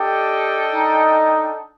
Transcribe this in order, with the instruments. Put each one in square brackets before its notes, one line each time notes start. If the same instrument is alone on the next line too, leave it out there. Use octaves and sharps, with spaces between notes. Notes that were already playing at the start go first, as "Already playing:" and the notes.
Already playing: [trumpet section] D4 A4 D#5 G5 [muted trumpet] G4
[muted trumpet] D#4